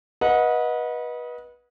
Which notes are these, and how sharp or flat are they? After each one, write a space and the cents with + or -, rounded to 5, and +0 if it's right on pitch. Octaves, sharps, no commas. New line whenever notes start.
B4 -25 D#5 +15 F#5 -25